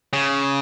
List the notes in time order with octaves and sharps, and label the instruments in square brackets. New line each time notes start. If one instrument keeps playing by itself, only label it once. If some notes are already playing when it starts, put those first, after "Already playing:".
[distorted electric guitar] C#3